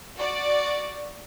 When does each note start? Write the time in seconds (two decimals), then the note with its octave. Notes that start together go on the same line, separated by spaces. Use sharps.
0.17 F#4 D5